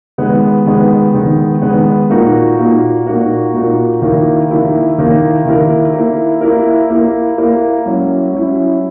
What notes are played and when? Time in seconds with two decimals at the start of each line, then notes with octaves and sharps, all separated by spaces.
0.18 D#3 G#3 B3
0.66 D#3 G#3 B3
1.14 D#3 G#3 B3
1.62 D#3 G#3 B3
2.10 A#2 A#3 D#4 F#4 A#4
2.58 A#2 A#3 D#4 F#4 A#4
3.06 A#2 A#3 D#4 F#4 A#4
3.54 A#2 A#3 D#4 F#4 A#4
4.02 D#3 A#3 E4 A#4
4.50 D#3 A#3 E4 A#4
4.98 D#3 A#3 E4 A#4
5.46 D#3 A#3 E4 A#4
5.93 A#3 E4 A#4
6.41 A#3 E4 A#4
6.90 A#3 E4 A#4
7.38 A#3 E4 A#4
7.86 F#3 C#4 E4
8.33 F#3 C#4 E4